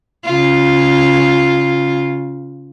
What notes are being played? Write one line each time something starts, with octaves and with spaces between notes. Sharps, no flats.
C#3 F4